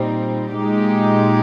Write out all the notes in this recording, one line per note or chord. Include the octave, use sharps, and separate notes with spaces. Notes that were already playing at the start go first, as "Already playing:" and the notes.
Already playing: A#2 G3 C4 D#4
A#2 G#3 D#4 G4